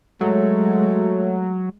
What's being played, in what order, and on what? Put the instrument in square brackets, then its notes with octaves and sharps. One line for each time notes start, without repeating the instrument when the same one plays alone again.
[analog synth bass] F#3 [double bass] G#3 [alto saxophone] A3